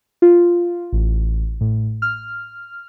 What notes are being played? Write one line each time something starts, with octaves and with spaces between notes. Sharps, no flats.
F4
A1
A2
F6